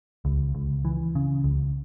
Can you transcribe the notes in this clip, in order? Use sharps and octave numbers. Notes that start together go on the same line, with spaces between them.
C#2
C#2
E3
C#3
C#2